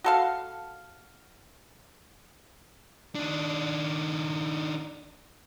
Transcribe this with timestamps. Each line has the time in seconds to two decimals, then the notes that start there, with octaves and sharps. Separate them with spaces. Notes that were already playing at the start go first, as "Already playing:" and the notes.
0.04 F#4 A4 F5
3.15 D#3 D4